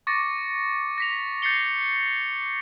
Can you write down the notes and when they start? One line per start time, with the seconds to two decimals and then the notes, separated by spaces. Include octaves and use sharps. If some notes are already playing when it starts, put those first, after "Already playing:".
0.07 C#6 D6 A6 A#6 C#7
0.98 A#6 B6 F7
1.42 G6 A6 C7 C#7 G7